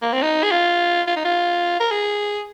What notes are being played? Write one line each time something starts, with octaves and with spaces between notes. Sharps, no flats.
A#3
C4
D#4
G#4
F4
F4
D#4
F4
A#4
G#4